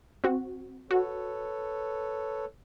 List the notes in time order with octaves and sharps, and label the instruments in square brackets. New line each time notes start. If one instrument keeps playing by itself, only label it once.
[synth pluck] C4 F#4
[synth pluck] F#4 [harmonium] A4 B4 C#5